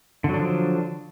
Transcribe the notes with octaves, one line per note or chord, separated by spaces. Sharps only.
D3 F3 F#3 D4